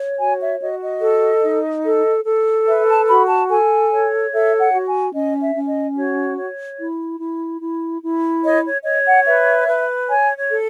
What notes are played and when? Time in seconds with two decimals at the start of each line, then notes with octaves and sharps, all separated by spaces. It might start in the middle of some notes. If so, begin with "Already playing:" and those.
Already playing: C#5
0.19 F#4 G#5
0.40 E5
0.60 F#4 D#5
0.81 D#5
1.01 A4
1.43 D#4
1.85 A4
2.25 A4
2.66 B4 E5
2.87 A5
3.07 F#4 B5
3.28 A5
3.49 A4 G#5
3.91 C#5
4.31 A4 E5
4.59 F#5
4.72 F#4
4.87 G#5
5.13 C#4 D#5
5.41 E5
5.55 C#4
5.68 D#5
5.96 F#4 C#5
6.37 C#5
6.79 E4
7.19 E4
7.60 E4
8.02 E4
8.43 C#5 D#5
8.65 C#5
8.84 C#5 D#5
9.05 F#5
9.25 B4 E5
9.67 B4
10.08 C#5 G#5
10.36 C#5
10.50 A4